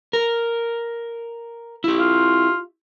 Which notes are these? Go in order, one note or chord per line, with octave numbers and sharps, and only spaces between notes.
A#4
E4 G4
F4